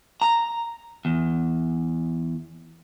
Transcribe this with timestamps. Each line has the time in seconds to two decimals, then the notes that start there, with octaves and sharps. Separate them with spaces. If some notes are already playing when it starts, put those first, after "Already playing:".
0.22 A#5
1.05 E2